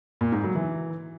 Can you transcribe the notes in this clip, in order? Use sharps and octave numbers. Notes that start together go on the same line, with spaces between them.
A#2
G#2
F#3
E3